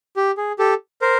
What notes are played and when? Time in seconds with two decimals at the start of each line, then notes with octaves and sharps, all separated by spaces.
0.17 G4
0.37 G#4
0.59 G4 A4
1.02 A#4 C5